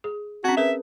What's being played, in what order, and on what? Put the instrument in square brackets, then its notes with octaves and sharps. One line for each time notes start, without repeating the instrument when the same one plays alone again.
[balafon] G#4
[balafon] C4 C#4 [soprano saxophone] F#4
[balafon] G#4 A#4 B4 [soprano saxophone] E5